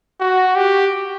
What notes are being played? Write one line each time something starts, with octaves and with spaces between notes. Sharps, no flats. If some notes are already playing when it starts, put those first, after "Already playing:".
F#4
G4